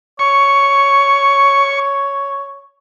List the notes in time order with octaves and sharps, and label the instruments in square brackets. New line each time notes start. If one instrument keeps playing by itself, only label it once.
[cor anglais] C#5 [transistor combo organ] C#6